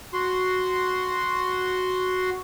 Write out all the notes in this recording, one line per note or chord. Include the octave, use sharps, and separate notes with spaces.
F#4 C6